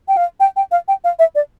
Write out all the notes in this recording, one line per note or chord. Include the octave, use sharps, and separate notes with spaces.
G5
F5
G5
G5
F5
G5
F5
E5
D5